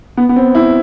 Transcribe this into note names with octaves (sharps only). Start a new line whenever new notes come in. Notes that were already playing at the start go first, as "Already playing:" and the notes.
B3
B3
C4
E4